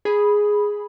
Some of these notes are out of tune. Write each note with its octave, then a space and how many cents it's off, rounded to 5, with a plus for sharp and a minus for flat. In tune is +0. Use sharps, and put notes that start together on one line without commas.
G#4 +0 B5 -5